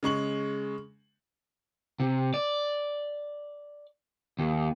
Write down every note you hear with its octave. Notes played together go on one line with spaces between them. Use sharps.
C#3 G#3 C#6 F#7
C3
D5
D#2